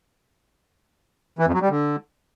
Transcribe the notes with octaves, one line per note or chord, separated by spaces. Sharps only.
E3
F2
F#3
G3
D3